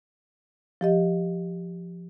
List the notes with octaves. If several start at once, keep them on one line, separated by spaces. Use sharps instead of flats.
F3 G4 D#5